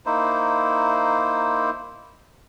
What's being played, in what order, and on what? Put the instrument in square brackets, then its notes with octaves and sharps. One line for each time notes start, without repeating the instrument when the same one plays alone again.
[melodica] A#3 D#4 E4 C5